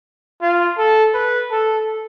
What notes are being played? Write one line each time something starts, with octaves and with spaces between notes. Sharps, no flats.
F4
A4
B4
A4